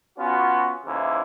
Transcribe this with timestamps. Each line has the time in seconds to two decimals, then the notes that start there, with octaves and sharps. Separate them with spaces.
0.18 B3 C#4 F4 F#4
0.85 D#2 C#3 E3 E4 C5